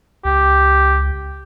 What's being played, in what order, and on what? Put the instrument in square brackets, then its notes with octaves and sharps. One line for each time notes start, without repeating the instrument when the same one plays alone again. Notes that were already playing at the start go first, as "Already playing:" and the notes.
[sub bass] C#2 [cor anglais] G4